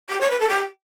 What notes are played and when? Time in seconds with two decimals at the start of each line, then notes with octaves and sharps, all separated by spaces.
0.09 G4
0.20 C#5
0.30 B4
0.40 A4
0.49 G4